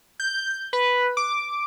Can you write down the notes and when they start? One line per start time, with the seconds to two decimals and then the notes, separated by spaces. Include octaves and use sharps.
0.20 G6
0.73 B4
1.17 D6